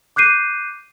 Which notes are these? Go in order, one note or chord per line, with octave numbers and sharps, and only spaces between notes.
D6 F#6 G6 C7 D#7